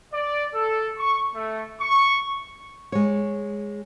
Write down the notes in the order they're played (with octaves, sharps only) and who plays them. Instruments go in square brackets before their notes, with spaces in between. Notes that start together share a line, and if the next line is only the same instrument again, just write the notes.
[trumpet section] D5
A4
C#6
A3
C#6
[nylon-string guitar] G#3 C#5